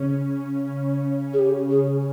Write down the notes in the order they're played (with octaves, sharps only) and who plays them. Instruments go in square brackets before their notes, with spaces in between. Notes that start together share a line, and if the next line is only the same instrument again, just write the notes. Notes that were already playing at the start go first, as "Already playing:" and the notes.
Already playing: [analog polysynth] C#3 C#4
[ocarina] G#4
G4
G#4